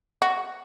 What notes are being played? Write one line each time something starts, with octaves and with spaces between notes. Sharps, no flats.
F#4